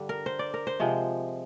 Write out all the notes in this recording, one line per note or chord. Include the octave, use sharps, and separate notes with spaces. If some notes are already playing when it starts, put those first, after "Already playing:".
Already playing: G2 D3 G3
A#4
C5
D5
A#4
C5
C3 F3 G#3